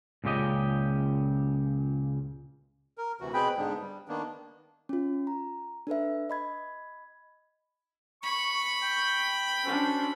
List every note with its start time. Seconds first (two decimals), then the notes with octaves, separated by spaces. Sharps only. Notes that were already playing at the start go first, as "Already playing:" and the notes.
0.24 C#2 A#2 C#3 G4 D#5
2.98 A#4
3.21 D2 C3 E3 F#4
3.34 B2 C4 G#4 B4 G5 B5
3.57 G#2 D3 G#3 B3 D4
3.80 G3
4.08 D#3 A#3 B3 D4
4.89 C#4 F4
5.27 A#5
5.87 D4 A4 B4 E5
6.30 D#5 B5 G#6
8.23 B5 C#6
8.84 G5
9.64 C#4 D4 F#4 A4 C5